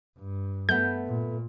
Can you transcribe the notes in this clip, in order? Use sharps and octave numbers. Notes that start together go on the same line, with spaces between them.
G2
A3 B3 G6
A#2